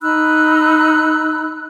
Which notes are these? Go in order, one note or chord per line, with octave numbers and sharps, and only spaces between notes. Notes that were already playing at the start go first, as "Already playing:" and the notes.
D#4 B5 E6 F#6